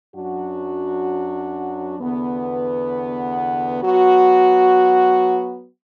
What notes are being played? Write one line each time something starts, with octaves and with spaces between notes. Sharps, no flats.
F#2 F#3 D4 F#4
E2 D3 B3
F#3 B3 F#4